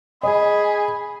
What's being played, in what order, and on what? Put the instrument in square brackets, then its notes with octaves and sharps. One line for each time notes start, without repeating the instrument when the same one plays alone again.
[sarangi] G#4 [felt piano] D#5 [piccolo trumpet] B5